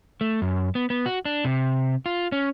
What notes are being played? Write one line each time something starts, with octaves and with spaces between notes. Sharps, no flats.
A3
F#2
B3
B3
F#4
D4
C3
F4
C#4